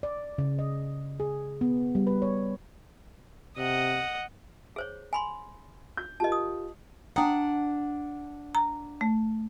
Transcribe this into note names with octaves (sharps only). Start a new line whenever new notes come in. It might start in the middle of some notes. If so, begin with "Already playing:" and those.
D5
C#3
D#5
G#4
B3
G3
B4
C#5
C3 D#5 F#5
G#4 C5 C#5
G#5 B5 C6
G6
F4 G4 A#4 D#5 A5
D#6
D4 F#5 G5 A#5 D#6
A#5
A3